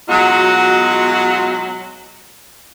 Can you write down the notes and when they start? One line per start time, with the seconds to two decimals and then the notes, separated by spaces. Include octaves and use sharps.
0.08 B2 F#3 G#3 D#4 F4 F#4